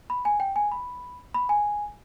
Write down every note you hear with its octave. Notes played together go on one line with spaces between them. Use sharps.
B5
G#5
G5
G#5
B5
B5
G#5